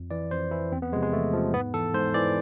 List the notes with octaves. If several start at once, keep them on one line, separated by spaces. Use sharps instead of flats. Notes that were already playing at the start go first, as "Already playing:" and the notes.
Already playing: F2
E3 D5
F2 C5
E3 E4
E2 C4
B3
C3 F3 G#3
G#3
E2 A3
C3 F3
G#2 B3
E3 A4
G#2 C5
E3 D5